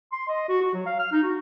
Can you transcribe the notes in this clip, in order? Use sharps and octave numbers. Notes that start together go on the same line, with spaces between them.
C6
D#5
F#4
F#4
F#3
F5
F6
D#4
F#4